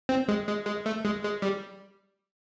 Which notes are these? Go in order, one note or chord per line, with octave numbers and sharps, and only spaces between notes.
C4
G#3
G#3
G#3
A3
G#3
G#3
G3